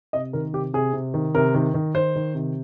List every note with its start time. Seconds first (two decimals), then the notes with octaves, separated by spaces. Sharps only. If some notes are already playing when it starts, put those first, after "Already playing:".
0.13 C3 D#5
0.33 D#3 A#4
0.53 C3 G4
0.73 C3 G#4
0.93 C3
1.14 D#3
1.34 C3 A#4
1.54 D#3
1.74 D#3
1.95 D#3 C5
2.16 D#3
2.34 C3